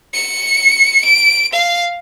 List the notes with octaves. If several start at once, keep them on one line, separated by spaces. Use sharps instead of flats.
C#7
D7
F5